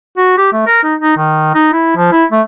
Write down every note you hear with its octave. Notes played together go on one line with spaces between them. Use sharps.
F#4
G4
A3
A#4
D#4
D#4
D#3
D#4
E4
F3
E4
A3